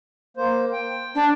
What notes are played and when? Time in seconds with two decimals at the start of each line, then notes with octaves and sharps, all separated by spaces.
0.37 A#3 C5
0.73 G5
1.15 D4